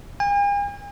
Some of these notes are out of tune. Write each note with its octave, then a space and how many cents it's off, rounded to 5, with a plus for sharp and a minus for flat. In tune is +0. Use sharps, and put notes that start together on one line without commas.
G#5 -45